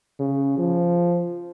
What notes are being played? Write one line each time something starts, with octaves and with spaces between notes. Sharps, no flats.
C#3
F3